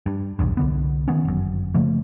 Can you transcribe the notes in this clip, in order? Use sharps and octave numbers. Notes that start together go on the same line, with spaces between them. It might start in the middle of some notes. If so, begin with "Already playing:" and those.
G2
F1 B1 E2 G2
C2 D3 B3
D#3 B3 C#4
G1 F#2
C#3 F3 A3 A#3